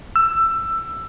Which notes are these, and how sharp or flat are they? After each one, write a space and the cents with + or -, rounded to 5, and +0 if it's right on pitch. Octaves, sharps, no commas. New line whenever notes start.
E6 +15